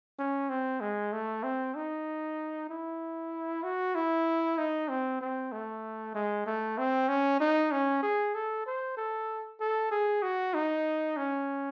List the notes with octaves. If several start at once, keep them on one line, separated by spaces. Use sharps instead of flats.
C#4
C4
G#3
A3
C4
D#4
E4
F#4
E4
D#4
C4
C4
A3
G#3
A3
C4
C#4
D#4
C#4
G#4
A4
C5
A4
A4
G#4
F#4
D#4
C#4